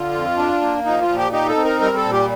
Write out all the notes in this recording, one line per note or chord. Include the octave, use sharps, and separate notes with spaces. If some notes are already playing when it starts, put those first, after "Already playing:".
Already playing: D3 F4
F2
D4
A#3
F3 D#4
F4
A#2
G4
D#4 G4
A4
C4
A#4
G3 A#4
A4
A#2
G4